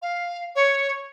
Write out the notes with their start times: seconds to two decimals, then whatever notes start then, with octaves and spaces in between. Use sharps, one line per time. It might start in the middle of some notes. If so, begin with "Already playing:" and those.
0.02 F5
0.55 C#5